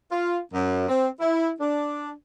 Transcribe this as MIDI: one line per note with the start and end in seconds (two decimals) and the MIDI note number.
0.10 0.38 65
0.53 0.88 42
0.88 1.08 60
1.20 1.50 64
1.60 2.11 62